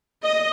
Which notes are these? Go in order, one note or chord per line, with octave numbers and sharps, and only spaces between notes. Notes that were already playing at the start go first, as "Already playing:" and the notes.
D#5